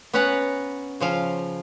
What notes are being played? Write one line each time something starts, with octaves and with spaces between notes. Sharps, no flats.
B3 C#4 B4 C#5 F#5 A#5
C#3 F3 F5